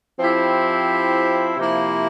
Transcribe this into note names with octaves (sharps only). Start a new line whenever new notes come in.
F3 C4 E4 G4
C3 F3 A#3 E4